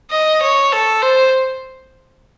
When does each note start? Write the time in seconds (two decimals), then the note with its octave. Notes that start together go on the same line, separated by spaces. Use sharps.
0.11 D#5
0.42 C#5
0.73 A4
1.03 C5